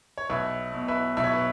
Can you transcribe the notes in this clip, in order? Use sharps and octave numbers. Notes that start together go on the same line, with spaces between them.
C#5
B1 B4 E5
B2
B4 E5
B1 E5
C#5
B4